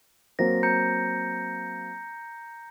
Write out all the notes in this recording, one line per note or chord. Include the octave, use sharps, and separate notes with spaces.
F#3 A#3 C4 A#6
A#5 G6 C#7